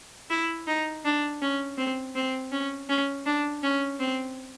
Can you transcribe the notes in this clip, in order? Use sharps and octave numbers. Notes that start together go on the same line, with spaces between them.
E4
D#4
D4
C#4
C4
C4
C#4
C#4
D4
C#4
C4